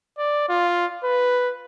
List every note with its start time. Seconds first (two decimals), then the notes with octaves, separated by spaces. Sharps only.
0.18 D5
0.49 F4
1.04 B4